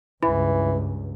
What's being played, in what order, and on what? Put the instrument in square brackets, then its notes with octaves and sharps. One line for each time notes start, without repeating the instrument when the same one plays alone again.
[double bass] C#2 G2 [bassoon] E3 [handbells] E4